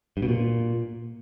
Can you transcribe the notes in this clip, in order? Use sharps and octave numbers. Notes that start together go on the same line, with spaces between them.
G2
B2
A#2